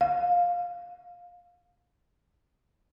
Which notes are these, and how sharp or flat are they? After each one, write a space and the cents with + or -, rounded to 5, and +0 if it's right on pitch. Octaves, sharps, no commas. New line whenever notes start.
F5 +15